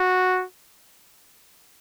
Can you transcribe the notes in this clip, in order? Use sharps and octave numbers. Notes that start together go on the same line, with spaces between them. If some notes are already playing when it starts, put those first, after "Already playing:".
Already playing: F#4